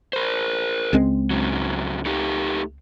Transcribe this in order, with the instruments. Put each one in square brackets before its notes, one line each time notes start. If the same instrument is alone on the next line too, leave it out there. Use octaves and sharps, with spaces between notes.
[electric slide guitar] A#4 C5
[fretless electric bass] C#2 G#3 C4
[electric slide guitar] G#2 C#3 F#3
A3 D#4 G4